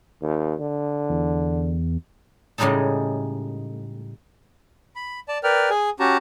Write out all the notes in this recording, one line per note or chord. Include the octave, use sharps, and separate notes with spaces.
D#2
D3
E2
A2 C#3 G3 G#3 D#4 A4
B5
D5 A5
A#4 B4 D5 G5 F6
G#4 G#5
C#4 F#4 G4 A5 A#5